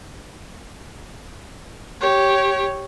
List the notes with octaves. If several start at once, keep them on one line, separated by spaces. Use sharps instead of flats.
G4 C#5